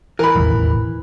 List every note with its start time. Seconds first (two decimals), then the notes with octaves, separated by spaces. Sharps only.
0.19 E3 A#4 B5
0.35 E1 A1 D#2